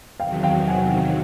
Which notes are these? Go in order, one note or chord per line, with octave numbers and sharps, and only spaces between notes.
E2 C3 D#3 F#3 F5 G5
F5 G5
F#5 G#5